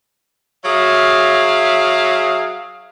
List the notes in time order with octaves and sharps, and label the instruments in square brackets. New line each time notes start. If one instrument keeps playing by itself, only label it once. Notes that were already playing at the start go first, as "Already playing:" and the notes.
[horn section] F#3 G#4 E5 F5